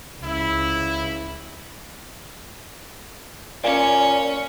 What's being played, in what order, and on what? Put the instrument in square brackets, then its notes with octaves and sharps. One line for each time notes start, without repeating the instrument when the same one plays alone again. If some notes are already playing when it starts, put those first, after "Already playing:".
[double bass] C#2 [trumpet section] E4
[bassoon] A#2 [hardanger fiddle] C#4 [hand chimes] D5 F5 G#5